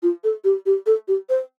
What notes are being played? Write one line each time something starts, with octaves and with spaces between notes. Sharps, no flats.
F4
A4
G4
G4
A4
G4
C5